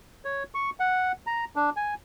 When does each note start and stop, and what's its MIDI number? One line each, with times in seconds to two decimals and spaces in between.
0.25 0.43 73
0.55 0.70 85
0.80 1.12 78
1.27 1.45 82
1.56 1.70 62
1.76 1.94 80